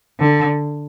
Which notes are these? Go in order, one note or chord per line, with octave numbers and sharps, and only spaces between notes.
D3